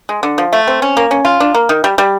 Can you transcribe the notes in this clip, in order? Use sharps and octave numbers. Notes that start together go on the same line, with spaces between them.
G#3
D3
F3
A3
C4
C#4
A#3
C#4
F4
D4
A#3
D#3
G3
G3